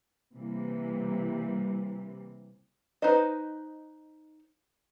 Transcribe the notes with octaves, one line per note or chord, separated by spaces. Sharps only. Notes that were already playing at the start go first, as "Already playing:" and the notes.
C3 E3 G3 A#3
D#4 B4 C5 D#5